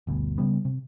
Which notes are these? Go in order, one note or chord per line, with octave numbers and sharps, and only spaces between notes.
G1 D2 B2
C#3 G3 B3
C3